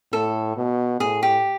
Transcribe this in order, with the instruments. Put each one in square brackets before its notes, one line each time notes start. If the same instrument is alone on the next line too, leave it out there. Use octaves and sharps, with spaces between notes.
[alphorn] A2 [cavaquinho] A4
[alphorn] B2
[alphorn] A2 [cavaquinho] G#4
[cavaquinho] G4